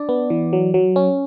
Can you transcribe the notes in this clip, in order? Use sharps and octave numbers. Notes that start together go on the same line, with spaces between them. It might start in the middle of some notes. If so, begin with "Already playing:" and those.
Already playing: D4 D5
B3
E3
F#3
F#3
C#4